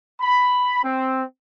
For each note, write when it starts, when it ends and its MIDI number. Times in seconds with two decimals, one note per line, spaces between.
0.20 0.79 83
0.82 1.21 60